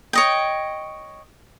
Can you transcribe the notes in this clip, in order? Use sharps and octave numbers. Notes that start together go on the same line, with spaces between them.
C#5 D#5 G5